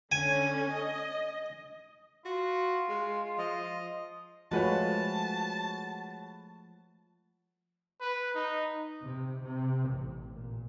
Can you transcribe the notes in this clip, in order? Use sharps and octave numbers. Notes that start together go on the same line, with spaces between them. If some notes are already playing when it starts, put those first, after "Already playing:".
D3 C#4 G#5
D#5
F4 F#4
G#3
F3 D#5
F3 G#3 A3 F4 F#4 B4 C#5 A5
B4
D#4
C3
C3
A1
A#2